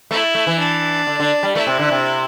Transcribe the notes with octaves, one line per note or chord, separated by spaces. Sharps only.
A3 E4
A3
E3
D4
D3
D3
G3
A3 E4
C3
D3
C3